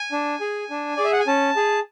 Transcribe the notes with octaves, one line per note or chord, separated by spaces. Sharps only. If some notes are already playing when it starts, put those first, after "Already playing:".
Already playing: G#5
D4
G#4
D4
G#4 D5
E5
F#5
G#5
C#4 A5
G#4